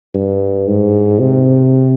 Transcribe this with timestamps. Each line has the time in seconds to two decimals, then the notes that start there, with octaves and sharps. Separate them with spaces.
0.15 G2
0.68 G#2
1.19 C3